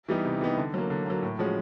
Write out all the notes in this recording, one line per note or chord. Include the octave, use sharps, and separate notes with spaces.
E3 G3 B3 D#4
C3
E3 G3 B3 D#4
D3
F#3 A#3
D3
F#3 A#3
A2
F3 G#3 C#4 F#4